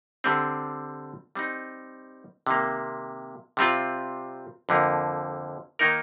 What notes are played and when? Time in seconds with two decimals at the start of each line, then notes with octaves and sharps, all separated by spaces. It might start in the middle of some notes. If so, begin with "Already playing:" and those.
0.24 D3 G3 C4
1.35 G3 C4 D#4
2.47 C3 D#3 G3 A#3
3.57 C3 G3 C4 F4
4.69 F2 D3 F3 A#3
5.79 D#3 A#3 D#4 A#4